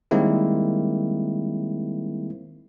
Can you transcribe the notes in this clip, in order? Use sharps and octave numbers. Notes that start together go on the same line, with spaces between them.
D#3 G3 G#3 A#3 C4 E4